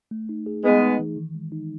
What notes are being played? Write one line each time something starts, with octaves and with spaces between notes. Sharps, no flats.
A3
D#4
G#4
G#3 B3 D#4
D#4
E3
D#3
G#3
D#4